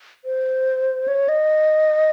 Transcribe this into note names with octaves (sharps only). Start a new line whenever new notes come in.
C5
C#5
D#5